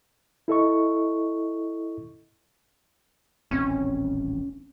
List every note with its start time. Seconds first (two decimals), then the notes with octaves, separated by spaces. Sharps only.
0.48 E4 A4 D#5 C#6
3.51 D#1 A1 C4 C#4